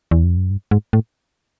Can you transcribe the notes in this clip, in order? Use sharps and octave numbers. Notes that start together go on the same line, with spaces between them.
E2
F2
F#2
G2
G#2
A2